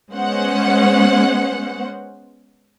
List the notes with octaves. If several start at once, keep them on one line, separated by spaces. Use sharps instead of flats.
G#3 B3 C#4 C5 F#5